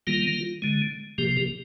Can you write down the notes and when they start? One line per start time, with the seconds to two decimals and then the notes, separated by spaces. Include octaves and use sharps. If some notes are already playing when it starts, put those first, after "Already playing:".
0.07 D#3 G3 A#3 F4
0.62 D3 G#3
1.18 C3 F3 A#3 G4
1.37 G4